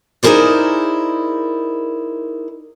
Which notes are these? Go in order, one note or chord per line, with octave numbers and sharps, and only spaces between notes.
D#4 E4 G#4 A#4 C5 D5